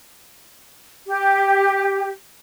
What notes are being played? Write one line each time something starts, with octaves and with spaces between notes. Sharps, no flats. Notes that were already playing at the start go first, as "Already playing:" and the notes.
G4